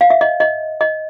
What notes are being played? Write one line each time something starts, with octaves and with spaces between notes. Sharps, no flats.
F5
E5
D#5
D#5
D#5